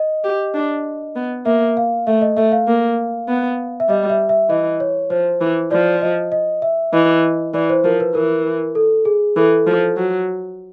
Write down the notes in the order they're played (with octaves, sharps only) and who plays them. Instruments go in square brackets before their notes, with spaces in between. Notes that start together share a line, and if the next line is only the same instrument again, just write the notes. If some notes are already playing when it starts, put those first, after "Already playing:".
Already playing: [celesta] D#5
[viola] G4
D4
B3
[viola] A#3 [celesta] E5
[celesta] F5
[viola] A3 [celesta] E5
[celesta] D#5
[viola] A3 [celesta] E5
[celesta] F5
[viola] A#3
B3
[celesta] E5
[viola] G3 [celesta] D#5
[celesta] E5
E5
[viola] E3 [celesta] D#5
[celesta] C#5
[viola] F3 [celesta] C5
[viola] E3
[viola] F3 [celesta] D5
[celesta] D#5
D#5
E5
[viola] E3 [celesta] D#5
[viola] E3 [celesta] D5
[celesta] C5
[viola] F3 [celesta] A#4
[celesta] B4
[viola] E3 [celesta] A#4
[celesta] A4
G#4
[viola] E3 [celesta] A4
[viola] F3
F#3